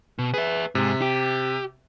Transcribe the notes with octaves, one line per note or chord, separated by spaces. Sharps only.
B2
G#4 B4 E5
G#2 C3
G4